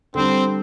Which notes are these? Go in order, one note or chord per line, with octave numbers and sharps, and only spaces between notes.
D3 G3 C4 D4